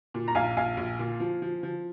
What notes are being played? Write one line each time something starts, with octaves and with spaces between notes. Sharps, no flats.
A#2
A#5
A#1 F5 G#5
A#1 F5 G#5
A#1
A#2
F3
F3
F3